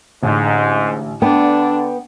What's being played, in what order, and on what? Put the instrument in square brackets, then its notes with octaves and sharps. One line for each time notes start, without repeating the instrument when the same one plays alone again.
[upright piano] A1 D3 [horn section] G#2
[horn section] D3 [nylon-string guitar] B3 [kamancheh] D4 [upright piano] G5